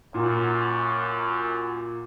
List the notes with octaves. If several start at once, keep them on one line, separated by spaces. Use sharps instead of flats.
F#2 A#2